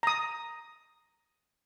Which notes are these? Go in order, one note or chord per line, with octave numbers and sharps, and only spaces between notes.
A#5 D#6